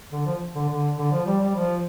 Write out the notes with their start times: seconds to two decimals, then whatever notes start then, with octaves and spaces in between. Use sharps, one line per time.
0.12 D3
0.26 F3
0.55 D3
0.69 D3
0.98 D3
1.12 F3
1.26 G3
1.40 G3
1.55 F3